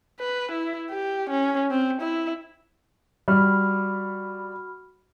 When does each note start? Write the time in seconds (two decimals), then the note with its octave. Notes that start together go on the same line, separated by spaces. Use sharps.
0.20 B4
0.51 E4
0.90 G4
1.29 C#4
1.71 C4
2.01 E4
3.28 G3 F#4 B5 F6